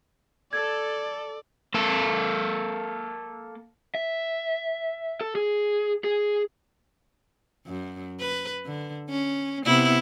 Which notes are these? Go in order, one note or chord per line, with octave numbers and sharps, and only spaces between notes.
A4 D5 G#6
A#3 A4
E5
A4
G#4
G#4
F#2
B4
D3
C#4
C3 B3 E4